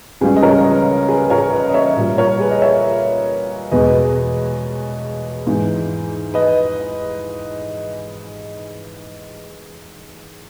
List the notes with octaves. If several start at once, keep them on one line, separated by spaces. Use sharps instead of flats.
C#2 C#3 G3 G#4 B4
D#5
A#4 C#5
B4 D#5
G#4 B4
B4
A#4 C#5
B4 D#5
D#5
C#5 E5
A#2 G3
A#4 C#5
G#4 B4
D#5
C#5 E5
E2 B2 G#3 B4 D#5
G#2 E3 G#3
B4 D#5